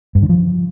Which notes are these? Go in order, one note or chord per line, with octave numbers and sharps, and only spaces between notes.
G2
D3
F3